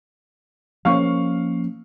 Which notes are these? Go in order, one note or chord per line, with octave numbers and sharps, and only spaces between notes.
F3 A#3 C#4 F5 C#6 F6